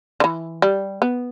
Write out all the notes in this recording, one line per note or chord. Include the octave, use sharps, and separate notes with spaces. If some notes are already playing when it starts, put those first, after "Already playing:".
D3
E3
G3
B3